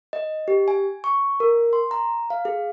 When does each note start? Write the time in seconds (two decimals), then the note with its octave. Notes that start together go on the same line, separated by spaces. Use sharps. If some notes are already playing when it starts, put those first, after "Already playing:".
0.13 D#5
0.48 G4
0.68 G#5
1.04 C#6
1.40 A#4
1.73 C6
1.91 A#5
2.30 F5
2.45 G#4